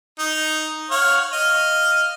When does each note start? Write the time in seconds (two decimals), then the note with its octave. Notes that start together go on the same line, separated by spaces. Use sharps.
0.19 D#4
0.91 C#5 F5 F#5
1.33 D#5 F5